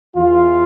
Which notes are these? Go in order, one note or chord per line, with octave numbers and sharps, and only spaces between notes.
E2 E3 F4